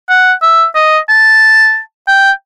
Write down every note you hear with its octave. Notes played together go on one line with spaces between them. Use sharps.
F#5
E5
D#5
A5
G5